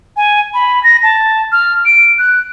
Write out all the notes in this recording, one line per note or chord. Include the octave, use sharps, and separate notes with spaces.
G#5
B5
A#6
A5
F6
D7
F#6